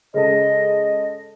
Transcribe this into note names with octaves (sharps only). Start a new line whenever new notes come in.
C#3 G#3 A4 D#5